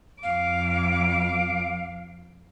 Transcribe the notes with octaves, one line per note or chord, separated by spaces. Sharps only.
F2 F5 D6